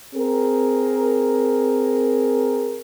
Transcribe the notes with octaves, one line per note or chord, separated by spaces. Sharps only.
C4 G#4 A#4